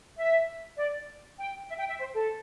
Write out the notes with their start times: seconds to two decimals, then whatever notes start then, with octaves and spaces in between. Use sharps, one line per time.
0.17 E5
0.77 D5
1.39 G5
1.69 E5
1.78 G5
1.88 E5
2.00 C5
2.14 A4